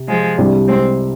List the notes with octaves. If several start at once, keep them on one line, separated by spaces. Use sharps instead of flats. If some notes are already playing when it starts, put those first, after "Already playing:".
Already playing: C3
F3 G#3
C2 C3 G3 D4 G4
G#3 C4